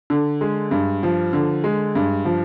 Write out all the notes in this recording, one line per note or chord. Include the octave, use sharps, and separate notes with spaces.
D3
G#3
G2
F3
D3
G#3
G2
F3